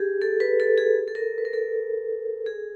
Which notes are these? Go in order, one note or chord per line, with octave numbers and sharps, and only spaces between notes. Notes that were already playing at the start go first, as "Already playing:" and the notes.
Already playing: G4 G#4
A4
B4
A4
G#4
A4
A#4
B4
A#4
A4
G#4